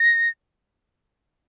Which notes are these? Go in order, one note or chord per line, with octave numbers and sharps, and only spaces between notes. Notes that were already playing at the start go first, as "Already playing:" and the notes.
Already playing: A#6